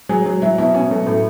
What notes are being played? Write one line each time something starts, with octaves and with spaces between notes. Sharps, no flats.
F#3 G#4
F#3
F#3 E4
B2 E4
B2 C#4
F#3 A3
A2 A3